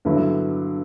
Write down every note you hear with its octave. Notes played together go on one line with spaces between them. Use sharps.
G2 D3 F#3 B3 E4